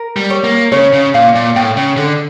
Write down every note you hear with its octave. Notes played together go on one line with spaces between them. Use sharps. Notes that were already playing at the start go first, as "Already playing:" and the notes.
Already playing: A#4
G3
C#5
A#3
C#3 C#5
C#3
A#2 F5
A#2
A2 G5
C#3
D3 A4